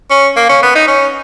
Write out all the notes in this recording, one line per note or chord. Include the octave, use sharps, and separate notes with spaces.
C#4
A#3
C#4
B3
D#4
C#4